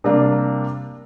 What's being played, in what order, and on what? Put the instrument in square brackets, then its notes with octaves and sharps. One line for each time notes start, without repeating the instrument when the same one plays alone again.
[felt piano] C3 G3 A#3 D4